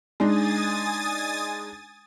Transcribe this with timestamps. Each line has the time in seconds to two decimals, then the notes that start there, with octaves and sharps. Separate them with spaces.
0.20 G#3 D4 D#4 G#5 D#6 A6